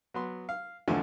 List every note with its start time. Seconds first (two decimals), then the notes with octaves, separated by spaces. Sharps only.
0.14 F#3 B3 C6
0.49 F5
0.88 G#1 E2 D3 F3 A3 G#5